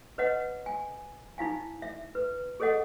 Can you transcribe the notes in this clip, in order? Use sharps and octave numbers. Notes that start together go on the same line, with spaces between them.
B4 C#5 D#5 F#5
G#5
D#4 E4 F5 G#5
E5
B4
G#4 A4 C#5 D#5 F#5